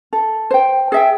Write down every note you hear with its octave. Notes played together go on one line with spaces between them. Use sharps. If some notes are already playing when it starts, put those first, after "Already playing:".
A4
C5 G5
G#4 E5 G5